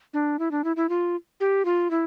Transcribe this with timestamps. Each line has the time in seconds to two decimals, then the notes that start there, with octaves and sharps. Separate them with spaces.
0.14 D4
0.39 E4
0.51 D4
0.64 E4
0.76 E4
0.89 F4
1.40 G4
1.65 F4
1.91 E4